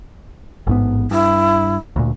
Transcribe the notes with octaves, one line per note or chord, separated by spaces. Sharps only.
A1 G#2 B3
G2 E4
D2 A#2